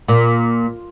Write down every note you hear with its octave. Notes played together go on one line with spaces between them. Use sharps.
A#2